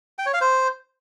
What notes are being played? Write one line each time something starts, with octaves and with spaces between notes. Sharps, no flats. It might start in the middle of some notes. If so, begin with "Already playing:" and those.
G5
C#5
F5
C5